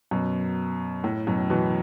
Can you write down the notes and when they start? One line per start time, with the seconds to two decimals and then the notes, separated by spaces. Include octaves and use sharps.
0.11 F#2 B2
1.04 A2
1.27 F#2 B2
1.50 B2 E3